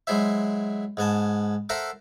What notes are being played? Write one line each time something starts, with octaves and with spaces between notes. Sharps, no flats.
F#3 G#3 E4 C5 E5
G#2 B3 G#5 A5
A4 A#4 C5 E5 F#5 A#5